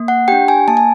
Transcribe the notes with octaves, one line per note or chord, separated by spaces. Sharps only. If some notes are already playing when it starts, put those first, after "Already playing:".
Already playing: A#3
F#5
D4 G4 G5
G#5
A#3 A5
G#5